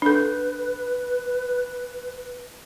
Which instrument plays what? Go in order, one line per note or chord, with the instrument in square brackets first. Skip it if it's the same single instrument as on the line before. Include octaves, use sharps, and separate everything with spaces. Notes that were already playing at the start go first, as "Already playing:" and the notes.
[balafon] D4 A4 [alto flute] B4